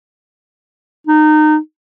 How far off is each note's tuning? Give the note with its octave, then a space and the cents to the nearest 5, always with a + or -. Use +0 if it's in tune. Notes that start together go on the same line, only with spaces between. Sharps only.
D#4 -25